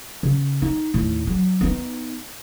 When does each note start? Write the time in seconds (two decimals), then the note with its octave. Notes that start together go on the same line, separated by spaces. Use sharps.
0.23 C#3
0.62 D#4
0.94 D#2 A2
1.27 F#3
1.61 B3 D#4